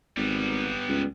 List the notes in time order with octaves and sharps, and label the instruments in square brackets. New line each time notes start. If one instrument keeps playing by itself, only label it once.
[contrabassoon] G#1 [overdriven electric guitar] G3 B3
[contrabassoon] C#2